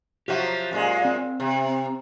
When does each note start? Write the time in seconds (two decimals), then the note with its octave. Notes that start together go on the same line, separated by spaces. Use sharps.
0.28 F3 F#3 F#4 G4 E5
0.71 F#2 A#2 G#3
1.05 C4
1.40 C3